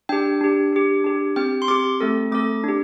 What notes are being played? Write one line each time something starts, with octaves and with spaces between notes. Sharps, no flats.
D4 G4 G5
D4 G4
D4 G4
D4 G4
C4 G4 G5
C6
C4 G4 D6
A3 C4 A4
A3 C4 A4 D6
D4 G4